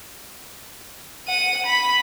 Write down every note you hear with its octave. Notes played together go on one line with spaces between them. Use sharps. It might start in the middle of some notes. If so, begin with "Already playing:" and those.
F#5 D#7
B5